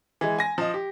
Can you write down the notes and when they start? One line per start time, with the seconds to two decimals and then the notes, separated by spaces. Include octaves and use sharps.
0.21 E3 G#3
0.39 G#5 A#6
0.58 F3 D#5
0.74 G4